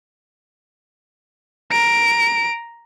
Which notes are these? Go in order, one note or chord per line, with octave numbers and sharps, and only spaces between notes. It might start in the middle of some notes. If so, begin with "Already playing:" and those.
A#5 D7